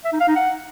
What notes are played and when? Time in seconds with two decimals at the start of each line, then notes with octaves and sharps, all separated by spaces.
0.05 E5
0.12 D#4
0.20 F5
0.28 D#4
0.35 F#5